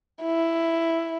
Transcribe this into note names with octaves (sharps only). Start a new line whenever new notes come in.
E4